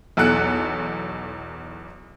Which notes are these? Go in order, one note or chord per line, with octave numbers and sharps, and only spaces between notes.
B1 E2 A4 F#6 C#7